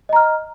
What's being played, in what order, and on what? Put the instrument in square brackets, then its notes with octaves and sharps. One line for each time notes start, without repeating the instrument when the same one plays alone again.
[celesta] D#5
A#5
F6